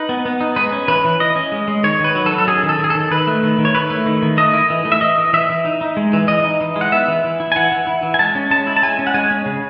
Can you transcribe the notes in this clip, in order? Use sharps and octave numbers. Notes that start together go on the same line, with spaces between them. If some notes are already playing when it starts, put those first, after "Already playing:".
Already playing: D#4 B4
B3
B3
D#4
G#3 B4
C#4
E3 B4
E3
E3 D#5
C#4
G#3
G#3
D#3 C#5
D#3 B4
F#3
A4
F#3
A4
C#4 G#4
D#3
A4
D#3
G#4
D#3 A4
D#3 B4
A3
D#3
D#3
C#5
E4 B4
A3
D#3
D#3
A3 D#5
E4
E3
A3
E5
E3 D#5
E3
E3 E5
E3
D#4
D#4
G#3
E3
E3 D#5
D#4
E3
G#3
F#5
B3 E5
E3
E3
E4
G#5
E3 F#5
E3
E4
E3
G#5
G#3 A5
C#4
G#3 A5
E4
A5
G#3 G#5
C#4
F#5
G#3 G#5
C#4
C#3